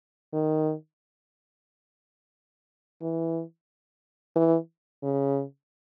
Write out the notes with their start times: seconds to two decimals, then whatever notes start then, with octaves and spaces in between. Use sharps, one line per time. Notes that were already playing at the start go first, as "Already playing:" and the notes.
0.33 D#3
3.02 E3
4.36 E3
5.03 C#3